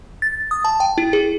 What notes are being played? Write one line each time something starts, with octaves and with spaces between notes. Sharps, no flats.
A6
D#6
A5
G5
E4
G#4